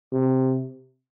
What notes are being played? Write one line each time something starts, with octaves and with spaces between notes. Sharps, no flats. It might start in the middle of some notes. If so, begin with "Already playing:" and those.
C3